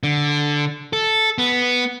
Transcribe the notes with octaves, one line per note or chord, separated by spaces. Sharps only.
D3
A4
B3